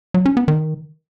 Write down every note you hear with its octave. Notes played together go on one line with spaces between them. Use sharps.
F#3
C#4
B3
D#3